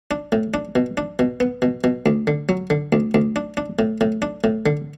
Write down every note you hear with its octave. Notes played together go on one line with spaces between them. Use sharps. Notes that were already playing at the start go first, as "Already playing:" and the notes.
D4
A2
D4
B2
D4
B2
B3
B2
B2
D2
D3
F#3
D3
D2
D2
D4
D4
A2
A2
D4
A2
D3